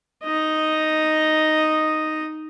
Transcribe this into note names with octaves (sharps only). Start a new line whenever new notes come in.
D#4 D#5